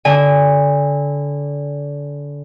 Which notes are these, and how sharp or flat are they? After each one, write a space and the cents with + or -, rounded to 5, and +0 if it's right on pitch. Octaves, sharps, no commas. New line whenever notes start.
D3 -25 G#5 -30